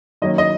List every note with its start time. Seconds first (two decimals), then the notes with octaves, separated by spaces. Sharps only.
0.22 D#3 F#3 A#3 C#4 D#5
0.38 D#5